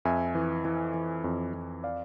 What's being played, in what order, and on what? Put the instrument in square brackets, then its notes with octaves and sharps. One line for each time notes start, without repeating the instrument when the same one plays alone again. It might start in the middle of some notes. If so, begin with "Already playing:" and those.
[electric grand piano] F2 E5 G#5
E3
E3
E3
F2
F2
D5 F5